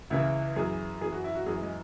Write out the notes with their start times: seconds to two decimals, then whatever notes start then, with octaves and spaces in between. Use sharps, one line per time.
0.10 C#2 C#3 E3 E4
0.56 F#2 E3 G#4
1.01 F#2 E3 G#4
1.12 F#4
1.24 E4
1.35 F#4
1.46 F#2 E3 G#4
1.61 G#3